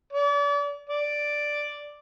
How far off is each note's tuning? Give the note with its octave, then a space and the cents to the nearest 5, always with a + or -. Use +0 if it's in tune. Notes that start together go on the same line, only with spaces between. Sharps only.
D5 -40
D5 +0